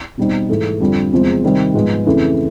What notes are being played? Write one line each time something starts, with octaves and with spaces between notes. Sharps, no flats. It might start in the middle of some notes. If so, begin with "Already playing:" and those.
B2 G3 C4 D#4
G#2 E3 A3
F2 D3 G3 C4 F4
E2 C3 F3 G#3 C4
C3 D#3 G3 C4
G#2 F3 G#3 B3
F2 C#3 E3 A3